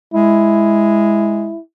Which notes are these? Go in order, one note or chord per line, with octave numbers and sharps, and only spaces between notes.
G#3 E4